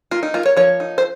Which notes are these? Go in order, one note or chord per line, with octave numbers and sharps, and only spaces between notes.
A#3 F4
D#4
A#3 F4
C#5
F3 C#5
D#4
C5